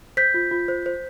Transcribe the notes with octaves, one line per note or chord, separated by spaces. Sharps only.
C5 G6 B6
F4
F4
C5
C5